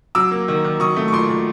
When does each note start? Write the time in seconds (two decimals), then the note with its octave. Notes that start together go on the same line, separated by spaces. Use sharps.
0.15 F#3 D6 E6
0.31 A#3
0.48 D#3
0.64 D#3
0.80 F#3 C#6 D#6
0.97 A3
1.08 C#6
1.12 A#2 C6 D6
1.30 A#2